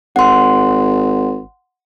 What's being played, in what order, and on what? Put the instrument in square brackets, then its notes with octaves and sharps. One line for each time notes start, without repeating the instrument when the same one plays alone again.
[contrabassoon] G#1 [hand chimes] F#5 C6